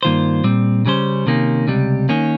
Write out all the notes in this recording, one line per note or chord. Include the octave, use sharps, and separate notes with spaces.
G2 D#3 A#3 F4 C5
A#2 G3 C4
C#3 G3 C#4 G#4 C5
C3 D#3 A#3 C#4
C#2 C3 G3
D#3 A#3 C#4